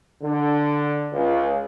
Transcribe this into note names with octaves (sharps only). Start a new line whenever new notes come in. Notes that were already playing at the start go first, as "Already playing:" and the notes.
D3
C#2